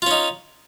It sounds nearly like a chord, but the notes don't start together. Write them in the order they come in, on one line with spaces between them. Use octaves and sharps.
F4 C#4 D#4